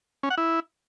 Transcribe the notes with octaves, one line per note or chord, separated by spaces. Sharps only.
C#4
F#5
E4